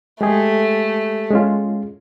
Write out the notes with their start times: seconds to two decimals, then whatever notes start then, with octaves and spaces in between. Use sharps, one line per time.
0.21 G#3 A3 G4 G#4
1.31 G#3 C#4 F4